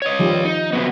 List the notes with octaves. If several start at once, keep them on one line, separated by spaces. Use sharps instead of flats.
C#5 D#5
D#3 F3 G3
D#4
C3 F#3 B3